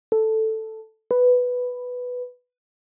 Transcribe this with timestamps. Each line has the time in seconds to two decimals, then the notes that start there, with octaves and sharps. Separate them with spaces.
0.12 A4
1.11 B4